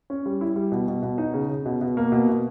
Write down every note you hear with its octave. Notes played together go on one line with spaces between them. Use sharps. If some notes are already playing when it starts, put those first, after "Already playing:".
C#4
G3
E4
G3
B2
B2
B2
D#4
C#3
C#3
B2
B2
A#3
B2
B2